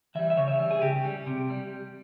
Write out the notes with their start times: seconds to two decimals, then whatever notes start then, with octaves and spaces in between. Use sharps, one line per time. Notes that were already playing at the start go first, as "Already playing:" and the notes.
0.15 E3 G3 E5
0.30 E5
0.37 C#3 C#5
0.48 E5
0.59 G3
0.71 G#4
0.82 C#3 G4
1.05 G3
1.26 C3
1.50 G3